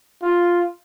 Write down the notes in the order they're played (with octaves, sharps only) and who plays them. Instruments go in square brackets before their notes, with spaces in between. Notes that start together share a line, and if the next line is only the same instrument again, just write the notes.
[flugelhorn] F4